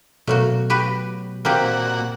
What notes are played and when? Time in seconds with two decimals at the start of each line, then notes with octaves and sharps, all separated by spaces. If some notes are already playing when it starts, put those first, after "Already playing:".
0.27 B2 F#3 A3 A#3 F#4
0.70 F#4 G4 B4
1.45 A#2 A#3 C4 F#4 G4